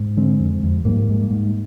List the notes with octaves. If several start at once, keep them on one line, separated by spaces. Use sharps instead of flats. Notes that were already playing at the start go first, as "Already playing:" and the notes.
Already playing: G#2
D3 G#3 C4
F2
F2
G#2 G3 A#3
G#2
G#2